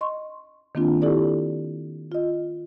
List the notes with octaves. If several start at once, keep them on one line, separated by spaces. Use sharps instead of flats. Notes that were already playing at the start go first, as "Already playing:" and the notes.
D#5 C6 C#6
D#3 A#3 C4 D4 F4
E4 G4 A4 D5
F4 D#5